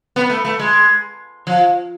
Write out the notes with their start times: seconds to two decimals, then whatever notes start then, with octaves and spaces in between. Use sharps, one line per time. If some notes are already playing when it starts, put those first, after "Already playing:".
0.16 B3
0.30 A3
0.45 A3
0.59 G#3
1.47 F3